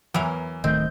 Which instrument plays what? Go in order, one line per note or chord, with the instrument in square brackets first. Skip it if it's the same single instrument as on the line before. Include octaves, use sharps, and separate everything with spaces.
[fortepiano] E2 [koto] E3 F#3 A#4
[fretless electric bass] D1 D#3 A3 [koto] C4 [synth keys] D#5 G6